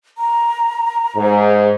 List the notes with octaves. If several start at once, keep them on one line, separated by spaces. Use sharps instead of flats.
A#5
G#2